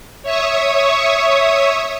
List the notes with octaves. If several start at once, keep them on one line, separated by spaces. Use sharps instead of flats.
C#5 E5 C#6 D#6